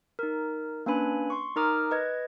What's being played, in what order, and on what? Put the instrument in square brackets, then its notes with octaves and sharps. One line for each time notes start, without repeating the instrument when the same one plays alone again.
[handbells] D#4 A#4
A#3 C#4 D4 B4 G#5 B5
C6 C#6
D#4 A#4 A#5 D6 D#6 F6
B4 D#5 G#6